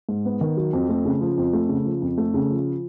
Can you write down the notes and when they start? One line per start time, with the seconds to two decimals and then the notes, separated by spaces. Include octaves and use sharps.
0.09 G#2
0.25 B3
0.41 D#3
0.57 F#3
0.73 F2
0.89 A3
1.05 C#3
1.21 F3
1.37 F2
1.53 A3
1.69 C#3
1.85 F3
2.02 F2
2.18 A3
2.34 C#3
2.50 F3